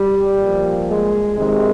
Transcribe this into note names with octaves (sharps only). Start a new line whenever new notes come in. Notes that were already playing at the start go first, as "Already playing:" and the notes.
Already playing: G3
A#2 F3
G#3
C3 D#3 G#3